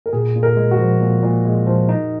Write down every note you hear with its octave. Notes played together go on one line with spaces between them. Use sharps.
A#4
A#2 G#4
A#2
A#4
G#3
F#4
F3
A#2
A#2
G#3
F3
D#4